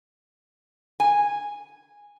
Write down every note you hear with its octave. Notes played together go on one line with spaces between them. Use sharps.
G#5